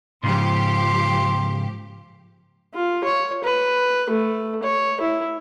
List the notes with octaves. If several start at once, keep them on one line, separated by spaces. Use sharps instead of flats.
G#2 C#3 F3 G4 C6
F4
C#5
B4
A3
C#5
E4